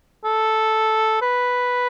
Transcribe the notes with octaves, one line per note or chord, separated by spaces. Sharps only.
A4
B4